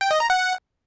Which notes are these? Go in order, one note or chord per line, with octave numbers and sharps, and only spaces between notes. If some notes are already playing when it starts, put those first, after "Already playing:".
G5
D#5
A#5
F#5